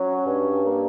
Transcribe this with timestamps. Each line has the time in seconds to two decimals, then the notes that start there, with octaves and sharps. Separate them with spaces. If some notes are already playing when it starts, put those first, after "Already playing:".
Already playing: F#3 C#4
0.26 G2
0.65 A#3